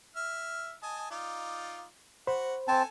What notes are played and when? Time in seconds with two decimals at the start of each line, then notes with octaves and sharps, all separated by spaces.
0.16 E5 F6
0.83 D#5 G#5 A5
1.11 D#4 F4 D5
2.27 F#4 C5 F#5 B5
2.68 C4 A4 G#5 A5